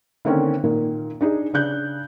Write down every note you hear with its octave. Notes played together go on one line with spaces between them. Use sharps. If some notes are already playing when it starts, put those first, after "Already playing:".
D3 D#3 A#3 C4 C#4
A#2 D#3 A#3
D4 D#4 G#4
C#3 D4 F#6 G6